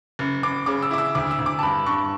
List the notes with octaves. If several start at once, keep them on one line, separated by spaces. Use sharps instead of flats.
F#1
F#1 D6
C#3 D6
E6
E4 D6
E6
D2 D6
E6
D2
D6
A5
G2 B5
G2 C#6